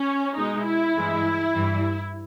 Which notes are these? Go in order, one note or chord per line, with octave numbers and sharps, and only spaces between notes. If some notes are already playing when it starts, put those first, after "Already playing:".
Already playing: C#4
B2 G#3 D#4
E4
G2 E3 G#3
G2 E3 G3